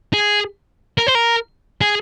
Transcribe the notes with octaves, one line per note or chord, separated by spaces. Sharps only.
G#4
A#4
C5
A#4
G#4